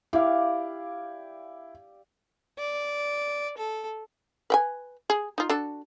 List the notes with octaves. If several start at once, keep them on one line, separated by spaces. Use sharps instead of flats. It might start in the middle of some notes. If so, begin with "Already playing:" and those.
E4 G4 D5 F5
D5
A4
B4 G5 G#5
G#4
D#4 F4
D4 F#4 A4